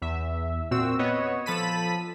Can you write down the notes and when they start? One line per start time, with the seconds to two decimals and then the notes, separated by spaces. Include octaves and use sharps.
0.02 E2 E5
0.71 A#2 C4 F#4 E6
0.99 B3 B4 C#5 D#5
1.46 F3 A4 A5 B5 B6 D#7